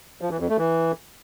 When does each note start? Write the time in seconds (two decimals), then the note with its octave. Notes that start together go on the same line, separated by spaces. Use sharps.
0.21 F3
0.31 E3
0.40 F2
0.49 A3
0.58 E3